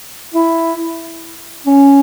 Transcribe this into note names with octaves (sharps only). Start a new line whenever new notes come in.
E4
C#4